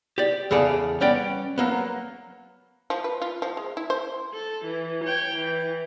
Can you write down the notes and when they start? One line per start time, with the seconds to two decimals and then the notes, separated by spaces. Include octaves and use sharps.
0.18 G4 D5
0.51 E2 C#3 G#4 A4 D5 F5
1.01 G3 B3 C#4 D5 G5
1.58 F#3 A#3 B3
2.90 F3
3.04 B4
3.22 F4
3.42 F3
3.57 G#3
3.77 E4
3.90 C5
4.34 A4
4.65 E3
5.05 C#5 G5
5.35 E3